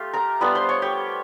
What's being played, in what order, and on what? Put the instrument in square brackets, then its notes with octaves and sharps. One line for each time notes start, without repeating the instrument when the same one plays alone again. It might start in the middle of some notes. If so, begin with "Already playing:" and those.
Already playing: [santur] A3 F4 G4
A#4 A#5
G3 B3 D4 F4 B4 B5
C5 C6
C#5 C#6
G4 G5